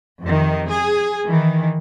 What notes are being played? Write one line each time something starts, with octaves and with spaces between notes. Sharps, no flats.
F2 C3 D#3
G#4
D#3 E3